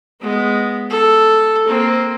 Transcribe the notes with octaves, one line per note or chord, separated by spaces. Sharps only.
G#3 B3
A4
A#3 C4